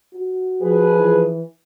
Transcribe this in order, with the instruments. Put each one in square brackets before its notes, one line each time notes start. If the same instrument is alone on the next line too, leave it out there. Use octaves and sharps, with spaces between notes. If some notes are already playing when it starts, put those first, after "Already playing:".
[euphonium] F#4
[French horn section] F3 G#4 B4
[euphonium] E3